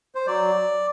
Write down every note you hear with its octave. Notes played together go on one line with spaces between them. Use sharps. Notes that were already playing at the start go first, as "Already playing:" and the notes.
C5
F#3 D5